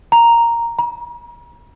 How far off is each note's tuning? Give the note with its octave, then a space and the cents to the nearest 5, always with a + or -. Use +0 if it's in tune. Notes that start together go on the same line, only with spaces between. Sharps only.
A#5 +0
A#5 +40